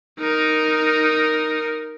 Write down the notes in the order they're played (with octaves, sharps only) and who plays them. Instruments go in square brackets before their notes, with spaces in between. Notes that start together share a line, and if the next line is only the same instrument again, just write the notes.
[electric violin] D#4 A#4